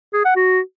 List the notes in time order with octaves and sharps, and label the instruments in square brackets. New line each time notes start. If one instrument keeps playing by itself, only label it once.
[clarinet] G#4
F#5
F#4